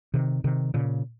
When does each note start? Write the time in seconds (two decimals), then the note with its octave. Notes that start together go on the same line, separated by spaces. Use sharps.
0.14 C3 D#3
0.44 C3 D#3
0.74 A#2 C#3